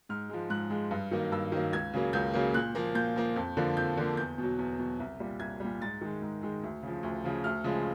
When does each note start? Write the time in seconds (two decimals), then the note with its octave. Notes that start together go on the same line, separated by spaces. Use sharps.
0.09 G#2 F6
0.29 F3 G#3
0.50 G#2 F#6
0.70 F3 G#3
0.91 G2
1.11 D#3 F#3 A#3
1.32 G2 E6
1.52 D#3 F#3 A#3
1.72 C#2 G#6
1.93 C#3 F#3 A#3
2.13 C#2 G6
2.33 C#3 F#3 A#3
2.54 A#2 F#6
2.75 F3 A#3
2.95 A#2 G6
3.16 F3 A#3
3.36 F2
3.57 D3 F3 A#3
3.77 F2 G6
3.97 D3 F3 A#3
4.17 E2 G6
4.38 B2 F#3
4.59 E2
4.79 B2 F#3
5.00 C2
5.20 A#2 G3
5.40 C2 G#6
5.60 A#2 G3
5.81 G#2 A6
6.01 D#3 G#3
6.22 G#2
6.42 D#3 G#3
6.63 D2
6.83 C#3 F3
7.03 D2
7.24 C#3 F3
7.44 D2 F6
7.64 C#3 F3 G#3